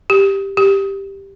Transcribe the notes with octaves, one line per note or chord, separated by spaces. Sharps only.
G4
G4